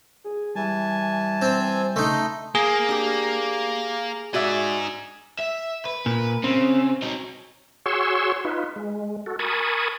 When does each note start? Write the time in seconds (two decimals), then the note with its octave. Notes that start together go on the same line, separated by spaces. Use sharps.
0.24 G#4
0.56 E3 G3 G#5 A5
1.42 C4
1.96 C#3 A3 D#4 D#5 C6
2.55 A#3 G#4
2.89 D4 G4
4.34 D#4 F#4 D5 E5 G#5
5.39 E5
5.85 B4
6.06 A#2
6.44 C#3 C4
7.02 F#3 D#4
7.86 F#4 G#4 C#5 C6 C#6 E6
8.45 D#4 F4 B4
8.76 G#3
9.26 F#4 A4
9.39 A#4 G#5 A5 B5 C#6 D#6